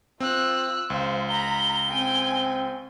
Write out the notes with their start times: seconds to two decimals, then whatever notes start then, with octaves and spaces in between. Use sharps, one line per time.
0.20 C4 F4 E6 F#6
0.90 C#2 C5 F5
1.28 A#5 B5 G7
1.89 C4 G5 G#5